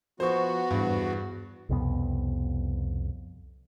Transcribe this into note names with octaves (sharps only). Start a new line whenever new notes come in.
F3 B3 F#4 C5 C#6
E2 G2
C2 F2 B2 B3